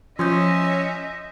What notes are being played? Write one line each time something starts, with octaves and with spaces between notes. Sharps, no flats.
F3 C#4 C#5 D#5 E5 C6 D#6 G6